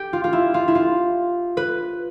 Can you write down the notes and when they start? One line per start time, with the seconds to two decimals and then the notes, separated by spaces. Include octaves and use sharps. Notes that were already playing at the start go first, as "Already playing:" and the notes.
Already playing: G4
0.13 F4
0.24 F4
0.33 E4
0.54 F4
0.68 E4
0.75 F4
1.57 B4